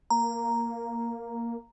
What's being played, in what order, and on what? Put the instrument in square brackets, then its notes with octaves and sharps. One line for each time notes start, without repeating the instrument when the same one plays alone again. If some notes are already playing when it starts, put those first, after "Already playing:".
[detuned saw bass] A#3 [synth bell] A#5